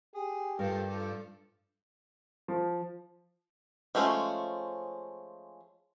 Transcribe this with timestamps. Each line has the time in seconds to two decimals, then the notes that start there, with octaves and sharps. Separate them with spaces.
0.15 G4 G#4
0.59 G2 F3 A4 A#4
0.89 F3 A4 D6
2.48 F3
3.95 F3 G#3 A3 C#4